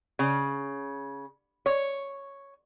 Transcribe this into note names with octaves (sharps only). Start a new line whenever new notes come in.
C#3
C#5